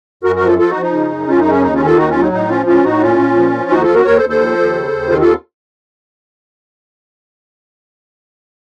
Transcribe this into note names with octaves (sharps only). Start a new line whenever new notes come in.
F#2 F#4 A#4
F#4 A#4
F3
F4 A4
F3 F4 A4
D#4 F#4
F3
D#4
C#3
F#2
F#2 C#4 F4
D#4
C#3
C#4
D#2 D#4
C#4 F4
D#3
F4 A4
D#2 D#4 F#4
C#4 F4
F#3
D#4
A2 D#4
F3 C#4 F4
A2 C#4 F4
A2 D#4 F#4
A#2 C#4 F4
A#2
F3
F3
D#2 D#4 F#4
F4 A4
D#2
F#4 A#4
D#2 A#4 C#5
A4 C5
D#2
A4 C5
F3
D#2
C#3
D#2
D#3 F4 A4
F4 A4